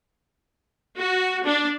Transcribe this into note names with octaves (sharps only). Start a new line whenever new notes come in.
F#4
D4